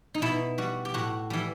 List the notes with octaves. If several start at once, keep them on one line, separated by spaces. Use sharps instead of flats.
D#4
B2 E4
G3 F#4
G4
A2 F#4
E3 G3